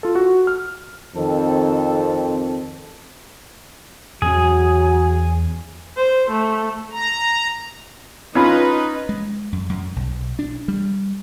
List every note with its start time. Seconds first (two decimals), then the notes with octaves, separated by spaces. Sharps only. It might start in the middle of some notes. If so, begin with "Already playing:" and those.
0.03 F4 A4
0.15 F#4
0.47 F6
1.15 F2 D#3 C4 A4
4.22 E2 F#3 C#4 G#4
5.97 C5
6.30 A3
6.92 A#5
8.35 C#4 D#4 F4 B4 B5
9.09 G#3
9.52 F#2
9.69 F#2
9.96 B1
10.39 D4
10.68 G3